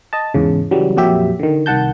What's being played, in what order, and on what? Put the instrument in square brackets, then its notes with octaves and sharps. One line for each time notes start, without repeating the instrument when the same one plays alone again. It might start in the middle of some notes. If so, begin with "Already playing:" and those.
[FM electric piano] D#5 A5
E2 G#2 C#3
C#3 E3 F#3 G3
F2 A#2 F#3 G4 E5
D3 D#3
C2 D#3 F#5 A5 G6